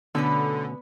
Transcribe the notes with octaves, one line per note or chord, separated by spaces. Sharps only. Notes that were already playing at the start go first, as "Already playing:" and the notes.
D2 B2 D3 B3 C#4 D4 B4